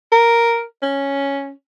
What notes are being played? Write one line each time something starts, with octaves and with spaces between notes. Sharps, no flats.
A#4
C#4